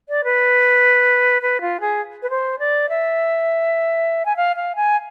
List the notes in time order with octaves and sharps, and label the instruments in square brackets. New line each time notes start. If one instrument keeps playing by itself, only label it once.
[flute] D5
B4
B4
F4
G#4
B4
C5
D5
E5
G#5
F5
F5
G#5